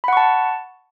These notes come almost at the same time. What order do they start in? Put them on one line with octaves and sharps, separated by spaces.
B5 F#5 C#6 A5